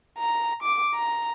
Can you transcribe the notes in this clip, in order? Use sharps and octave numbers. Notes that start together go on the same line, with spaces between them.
A#5
D6
A#5